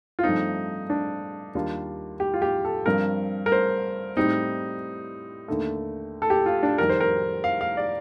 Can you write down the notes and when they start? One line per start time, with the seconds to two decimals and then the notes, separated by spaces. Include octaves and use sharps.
0.19 F4
0.23 G2 F3 A3 C4 D#4
0.90 D4
1.55 D#2 D#3 G3 D4 F4
2.20 G4
2.34 F4
2.42 G4
2.65 A4
2.86 G2 F3 C4 A#4
3.46 A#4
3.52 C5
4.17 A2 G3 C4 D#4
5.48 D#2 D3 A3
6.22 A4
6.30 G4
6.46 F4
6.63 D4
6.78 F2 D#3 G3 A#4
6.89 C5
7.00 A#4
7.44 F5
7.61 F5
7.77 D5